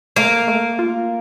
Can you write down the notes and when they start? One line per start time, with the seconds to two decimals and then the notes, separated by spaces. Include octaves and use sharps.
0.16 A3 A#3 A#4
0.48 A3
0.79 F4